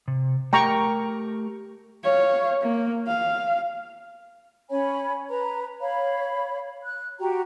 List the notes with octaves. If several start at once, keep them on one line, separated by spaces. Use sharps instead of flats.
C3
A3 G4 A#4 G5 A#5 C#6
C#5 F5
A#3
F5
C#4 C#5 G#5 B5
B4 A#5
C#5 F5 B5
F#6
F#4 G4 G5 A#5